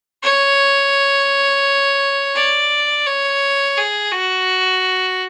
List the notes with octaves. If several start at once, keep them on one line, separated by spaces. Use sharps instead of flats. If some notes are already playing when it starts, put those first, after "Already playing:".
C#5
D5
C#5
G#4
F#4